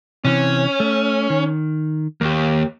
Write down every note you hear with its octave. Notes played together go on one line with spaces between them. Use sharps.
C3 E3 C4 C#4
A3
D#3
D#2 A#3 G4